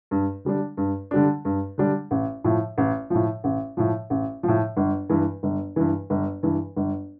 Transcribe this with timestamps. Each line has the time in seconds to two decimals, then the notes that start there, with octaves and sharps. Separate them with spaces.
0.11 G2
0.45 D3 G3 D4
0.77 G2
1.11 D3 G3 D4
1.45 G2
1.78 D3 G3 D4
2.11 A1
2.44 A2 F3
2.78 A1
3.10 A2 F3
3.44 A1
3.77 A2 F3
4.10 A1
4.43 A2 F3
4.77 G1
5.10 G2 E3
5.43 G1
5.76 G2 E3
6.10 G1
6.43 G2 E3
6.76 G1